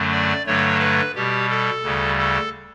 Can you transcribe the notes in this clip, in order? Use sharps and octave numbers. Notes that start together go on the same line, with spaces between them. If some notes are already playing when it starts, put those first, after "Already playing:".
Already playing: F#2 D3 F#3 A3
D5
G2 D3 F#3 A3 C#5
B4
B2 G3 G4
A4
D2 C#3 G3
A4